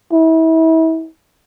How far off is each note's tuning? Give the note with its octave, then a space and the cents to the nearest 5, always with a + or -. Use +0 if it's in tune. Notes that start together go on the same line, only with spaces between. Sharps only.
E4 -35